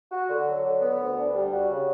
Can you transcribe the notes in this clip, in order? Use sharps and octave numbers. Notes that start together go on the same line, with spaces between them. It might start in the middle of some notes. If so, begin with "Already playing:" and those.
F#4
D3
F#3
D3
B3
D2
D4
G3
F#4
C#3